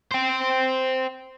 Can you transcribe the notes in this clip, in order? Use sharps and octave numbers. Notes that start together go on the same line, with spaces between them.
C5 G5